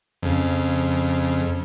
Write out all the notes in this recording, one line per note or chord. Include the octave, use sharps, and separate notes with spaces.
F2 C#3